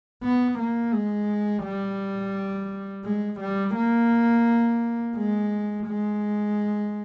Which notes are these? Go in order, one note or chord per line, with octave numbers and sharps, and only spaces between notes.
B3
A#3
G#3
G3
G#3
G3
A#3
G#3
G#3